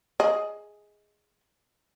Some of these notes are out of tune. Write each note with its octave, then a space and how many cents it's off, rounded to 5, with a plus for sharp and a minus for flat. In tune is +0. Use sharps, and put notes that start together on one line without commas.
G#4 +0 D#5 +10